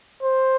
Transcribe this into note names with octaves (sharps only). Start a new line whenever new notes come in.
C5